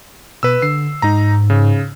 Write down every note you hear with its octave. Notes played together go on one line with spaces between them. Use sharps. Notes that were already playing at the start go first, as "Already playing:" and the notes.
B2 B4 E6
D3 C7
G#2 D#4 A#5
C#3